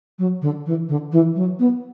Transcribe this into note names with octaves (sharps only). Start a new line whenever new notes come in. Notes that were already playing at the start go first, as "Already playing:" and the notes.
F#3
D3
E3
D3
E3
F#3
B3